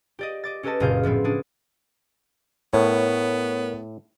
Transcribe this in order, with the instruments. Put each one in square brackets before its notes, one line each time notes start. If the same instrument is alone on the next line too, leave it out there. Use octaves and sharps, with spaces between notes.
[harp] G4 D5 D#5
D#5 D6 A6
C#4 G4 A4 B4 D#5 A5
F#1 A#2 G#4 F5 G6
A2 F3 B3 C4
C#4 D4 G#4
[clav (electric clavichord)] A2 [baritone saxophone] B3 [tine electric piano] A#4 C#5